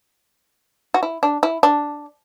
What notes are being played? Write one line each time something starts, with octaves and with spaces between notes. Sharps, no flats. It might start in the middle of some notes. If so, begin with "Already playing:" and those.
F#4
E4
D4
E4
D4